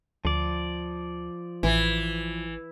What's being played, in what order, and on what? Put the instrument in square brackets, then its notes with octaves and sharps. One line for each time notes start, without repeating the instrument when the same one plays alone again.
[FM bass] D2 [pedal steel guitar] F3 D5
[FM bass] A1 [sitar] E3